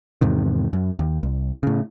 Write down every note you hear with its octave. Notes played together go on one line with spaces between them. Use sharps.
E2 G#2 C3 D#3
F#2
D#2
C2
A2 C#3